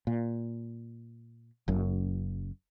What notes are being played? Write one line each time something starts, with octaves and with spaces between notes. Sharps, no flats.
A#2
F#1 F#2